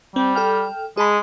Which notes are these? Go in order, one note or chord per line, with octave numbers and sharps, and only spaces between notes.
G3 C4
A4 G5 F6
G#3 G#4 A5 B5